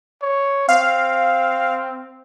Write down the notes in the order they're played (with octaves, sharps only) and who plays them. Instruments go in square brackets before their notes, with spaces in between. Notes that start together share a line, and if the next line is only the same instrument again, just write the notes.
[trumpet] C#5
[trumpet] C4 [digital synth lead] F5